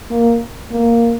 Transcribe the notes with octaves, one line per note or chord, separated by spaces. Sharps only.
A#3
A#3